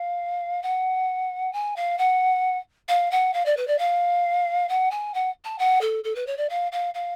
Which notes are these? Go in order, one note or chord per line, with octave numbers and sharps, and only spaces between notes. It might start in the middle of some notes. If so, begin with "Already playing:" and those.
Already playing: F5
F#5
G#5
F5
F#5
F5
F#5
F5
D5
B4
D5
F5
F#5
G#5
F#5
A5
F#5
A4
A4
B4
C#5
D5
F5
F5
F5